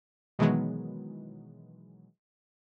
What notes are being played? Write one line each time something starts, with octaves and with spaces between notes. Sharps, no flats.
B2 D#3 E3 F#3 G#3 B3